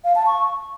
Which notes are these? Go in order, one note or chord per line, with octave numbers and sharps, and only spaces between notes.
F5
A5
C#6